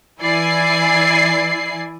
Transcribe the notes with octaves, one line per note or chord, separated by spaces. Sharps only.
E3 E4 D5 G#5 C7